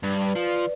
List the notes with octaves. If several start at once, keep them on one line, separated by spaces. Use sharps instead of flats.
G2 B4 D5
B4 D5
F3
B4 D5